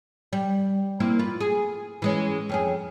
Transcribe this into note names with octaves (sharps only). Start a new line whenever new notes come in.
G3
A#3 C4 E4
F4 B4
G#4
E3 G#3 C#4
F2 C#4 G#4